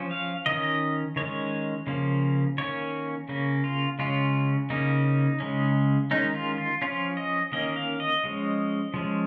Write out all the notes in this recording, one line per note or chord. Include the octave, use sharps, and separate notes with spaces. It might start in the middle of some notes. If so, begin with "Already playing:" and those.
Already playing: F3 C#4
F5
D#3 C#4 D#5
D#3 G#3 C#4 C#5
C#3 F3 A#3 C#4
D#3 A#3 C#4 C#5
C#3 A#3 C#4
F4
C#3 G#3 C#4 F4
C#3 A#3 C#4 D#4
C#3 G#3 C#4
D#3 G#3 C#4 D#4
F4
F4
F3 C#4 F4
D#5
D#3 A#3 C#4 D#5
F5
D#5
F3 G#3 C#4
F3 G#3 C#4